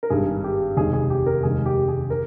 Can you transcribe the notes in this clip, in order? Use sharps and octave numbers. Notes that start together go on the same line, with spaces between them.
A#4
G#1 G2 D#3 G#4
G4
F1 D#2 D#3 G#3 G#4
G#4
G4
A#4
F1 D#2 D#3 G#3 G#4
G4
G#4
A#4